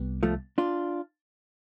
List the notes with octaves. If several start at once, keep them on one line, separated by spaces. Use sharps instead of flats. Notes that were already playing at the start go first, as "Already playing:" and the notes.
Already playing: C2 C3 G3 B3
F3 A3
D4 F4